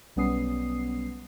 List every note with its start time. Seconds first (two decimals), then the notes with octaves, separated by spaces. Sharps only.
0.16 B1 G3 B3 C#4 D#6 C7